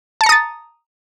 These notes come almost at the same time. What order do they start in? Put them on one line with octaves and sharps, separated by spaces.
A5 C#7 A#5 D#6 A6